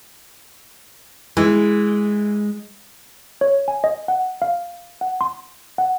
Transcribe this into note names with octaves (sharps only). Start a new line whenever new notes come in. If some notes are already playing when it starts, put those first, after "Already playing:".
E3 G#3
C#5
G#5
D#5
F#5
F5
F#5
C6
F#5